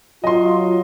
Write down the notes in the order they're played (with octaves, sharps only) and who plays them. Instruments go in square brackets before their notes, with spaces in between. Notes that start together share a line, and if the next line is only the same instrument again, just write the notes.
[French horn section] F#3 F4 [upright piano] D#5 C6